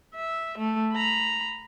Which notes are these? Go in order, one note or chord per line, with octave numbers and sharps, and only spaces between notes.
E5
A3
A#5 B5